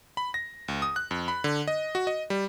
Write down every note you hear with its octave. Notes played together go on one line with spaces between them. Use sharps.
B5
A#6
C#2
D#6
F#6
F2
B5
D3
D#5
F#4
D#5
G3